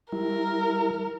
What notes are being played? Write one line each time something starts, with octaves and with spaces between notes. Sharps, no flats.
G3 E4 A#4